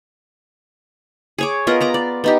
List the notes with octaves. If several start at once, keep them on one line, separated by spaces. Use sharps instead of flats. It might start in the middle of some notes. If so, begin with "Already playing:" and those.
G#4 C#5 D6
B3 F4 A#4 D#5
B3 A#5 D6
D5
B3 D#4 G4